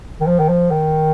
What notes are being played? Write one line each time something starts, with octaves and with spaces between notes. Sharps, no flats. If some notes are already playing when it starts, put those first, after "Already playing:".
D#3
F3
D#3
F3
D#3